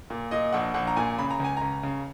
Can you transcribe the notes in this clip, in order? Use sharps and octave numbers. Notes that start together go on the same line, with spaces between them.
A#2
A#2 D#5
A#1 F#5
A#1 F#5
A#5
A#2 G#5
C#3 B5
A#5
C#2 G#5
C#2 A#5
C#3